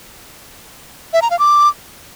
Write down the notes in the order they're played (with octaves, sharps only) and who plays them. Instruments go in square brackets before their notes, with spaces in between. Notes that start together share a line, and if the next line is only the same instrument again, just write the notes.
[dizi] E5
A#5
F5
D6